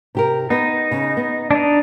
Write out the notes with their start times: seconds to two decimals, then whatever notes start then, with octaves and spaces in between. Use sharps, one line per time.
0.15 C3 G4 A#4
0.50 B3 D#4
0.91 C#3
1.17 B3
1.51 D4 D#4